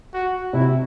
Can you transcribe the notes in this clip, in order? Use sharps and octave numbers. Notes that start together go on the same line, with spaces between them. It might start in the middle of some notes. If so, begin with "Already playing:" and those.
F#4
C3 E4